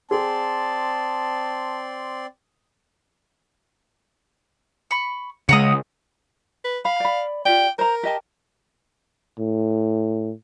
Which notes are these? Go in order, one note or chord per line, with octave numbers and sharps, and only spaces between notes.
C4 G#4 D5 A5 C6
B5 C#6
C#3 G#3 F#5 A#5 D#6
B4
F5 B5
D5 B5
F4 G4 D5 G5
A#4 C5 A#5
G4 D#5 A5
A2